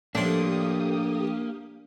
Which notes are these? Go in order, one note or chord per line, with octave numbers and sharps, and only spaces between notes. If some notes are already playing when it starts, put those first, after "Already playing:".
F2 A2 A#3 D4 G4 C6 D#6